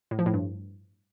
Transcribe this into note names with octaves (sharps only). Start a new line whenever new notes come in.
A2
F3
A2
G2